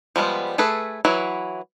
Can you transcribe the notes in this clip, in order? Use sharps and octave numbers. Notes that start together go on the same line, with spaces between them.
F3 G3 G#3 B3
A3 G#4 A4 B4
E3 F#3 E4